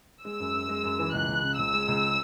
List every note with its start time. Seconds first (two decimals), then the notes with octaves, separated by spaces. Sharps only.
0.24 G#3 E6
0.40 F#2
0.54 F#2
0.69 G#3
0.84 F#2
0.99 E3
1.13 C#2 F#6
1.28 C#2
1.43 C#3
1.58 C#2 E6
1.73 G#3
1.88 C#2